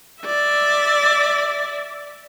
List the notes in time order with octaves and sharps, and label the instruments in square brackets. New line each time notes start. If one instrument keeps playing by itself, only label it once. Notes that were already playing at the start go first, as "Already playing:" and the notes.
[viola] D5 E5